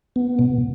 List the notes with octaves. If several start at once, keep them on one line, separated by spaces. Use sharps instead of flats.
B3
B2